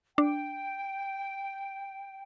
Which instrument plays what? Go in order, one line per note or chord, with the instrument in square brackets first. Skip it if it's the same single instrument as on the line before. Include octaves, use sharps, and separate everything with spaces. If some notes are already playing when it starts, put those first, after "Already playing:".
[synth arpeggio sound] D4 [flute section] G5